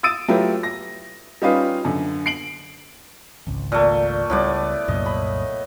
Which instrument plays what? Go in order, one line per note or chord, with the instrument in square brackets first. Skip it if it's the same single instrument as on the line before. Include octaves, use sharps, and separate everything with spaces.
[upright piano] D#6 E6 A6 D7 D#7
F#3 A3 E4 F4 G4 B4
A#6
G3 C#4 D#4 F4 B4 F5
F#2 D3
C7 D7 F#7
[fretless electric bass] G#1 C#2
[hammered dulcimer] A#2 A3
[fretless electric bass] C#2 G3 [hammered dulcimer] A2 B3 D5
[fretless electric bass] C2 F#2 A#2 [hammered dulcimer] D#5
[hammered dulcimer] B5